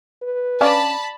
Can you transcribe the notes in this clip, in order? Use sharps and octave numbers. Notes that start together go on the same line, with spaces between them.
B4
C#4 D4 D5 F5 A5 B5